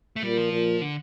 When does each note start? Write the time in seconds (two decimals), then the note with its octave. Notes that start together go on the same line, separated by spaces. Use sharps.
0.16 A3
0.22 A#2 G3
0.37 F3
0.52 A#2
0.81 D3